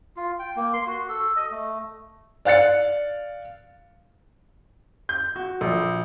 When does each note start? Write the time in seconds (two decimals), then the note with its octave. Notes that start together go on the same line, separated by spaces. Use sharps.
0.17 F4
0.39 G5
0.56 A#3
0.73 C6
0.87 F#4
1.09 A4
1.36 D#5
1.51 A3
2.45 D5 F5 F#6 A6 C#7
5.09 G6
5.36 F#4
5.61 A#1